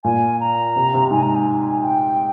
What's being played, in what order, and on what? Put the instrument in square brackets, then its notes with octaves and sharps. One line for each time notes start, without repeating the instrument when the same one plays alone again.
[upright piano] A#2 [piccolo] G#5
[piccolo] A#5
[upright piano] C3
C3
[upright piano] G#2 [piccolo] G#5
[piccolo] A#5
G#5
G5